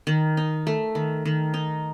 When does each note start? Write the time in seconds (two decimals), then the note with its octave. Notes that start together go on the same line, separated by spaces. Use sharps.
0.07 D#3
0.37 D#4
0.67 A3
0.95 D#3
1.25 D#3
1.54 D#4